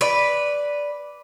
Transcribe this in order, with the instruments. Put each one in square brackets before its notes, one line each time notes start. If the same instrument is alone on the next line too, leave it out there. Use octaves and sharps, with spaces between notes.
[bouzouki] B4 D5